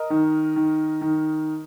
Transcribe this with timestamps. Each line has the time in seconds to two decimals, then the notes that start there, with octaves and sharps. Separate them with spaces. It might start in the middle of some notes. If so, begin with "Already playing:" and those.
Already playing: A#4 D#5
0.10 D#3
0.56 D#3
1.01 D#3